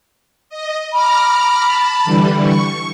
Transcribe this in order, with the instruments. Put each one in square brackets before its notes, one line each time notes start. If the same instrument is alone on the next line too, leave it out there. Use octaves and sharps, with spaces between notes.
[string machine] D#5
[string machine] A#5 D6 F6 [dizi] B5
[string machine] A5
D3 E3 G3
C#6